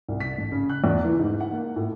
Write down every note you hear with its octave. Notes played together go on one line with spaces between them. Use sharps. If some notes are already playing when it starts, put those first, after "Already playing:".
C2
B6
A1
C#3
F#6
E2
E3
G#2
F#5
A#3
A2